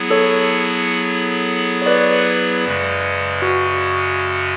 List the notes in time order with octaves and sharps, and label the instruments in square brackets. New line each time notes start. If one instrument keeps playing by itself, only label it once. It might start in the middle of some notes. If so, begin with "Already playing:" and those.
Already playing: [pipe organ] F#3 B3 E4 G#4
[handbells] A4 C#5
C#5
B4 D5
[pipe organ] F#2 C#3 G#3
[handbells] F#4